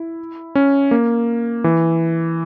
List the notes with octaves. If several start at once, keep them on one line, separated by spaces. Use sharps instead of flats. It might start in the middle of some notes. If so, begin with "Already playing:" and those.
Already playing: E4
C#4
A#3
E3